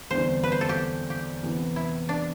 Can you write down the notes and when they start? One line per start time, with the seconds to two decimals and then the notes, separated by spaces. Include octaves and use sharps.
0.11 E2 D3 G3 C4 E4 C5
0.44 B4
0.52 C5
0.61 A4
0.69 G4
1.10 G4
1.43 E2 C3 E3 B3
1.76 E4
2.09 D4